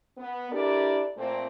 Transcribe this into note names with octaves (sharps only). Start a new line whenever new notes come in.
B3
D4 E4 G4 A4 A#4 D5
A#2 A3 C4